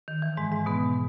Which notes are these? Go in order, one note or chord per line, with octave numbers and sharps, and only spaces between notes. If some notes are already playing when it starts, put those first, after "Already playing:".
D#3
E3
G#2 G#3
G#2 G#3
B2 B3